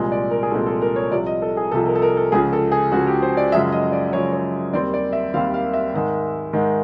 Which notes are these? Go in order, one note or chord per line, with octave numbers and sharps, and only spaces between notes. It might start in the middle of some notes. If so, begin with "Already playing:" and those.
Already playing: C2 A#2 F3 G#3 C4
D5
A#4
G#4
C2 A#2 F3 G#3 C4 A4
A4
A#4
C#5
C2 C3 F3 D5
D#5
A4
G#4
C2 C3 F3 A4
A#4
A4
A#4
A4
C#2 C#3 F3 G#4
A4
G#4
C#2 C#3 F3 F#4
G4
C5
D5
F#2 C#3 F3 G#3 E5
D#5
D5
F#2 C#3 F3 G#3 C#5
C#5
D#2 D#3 G3 C4 D5
D5
E5
D#2 D#3 G3 C4 F5
F5
E5
G#2 D#3 G#3
G#2 D#3 G#3